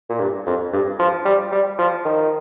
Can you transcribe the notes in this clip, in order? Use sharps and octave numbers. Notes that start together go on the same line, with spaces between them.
A#2
G2
F2
G2
F3
G3
G3
F3
D#3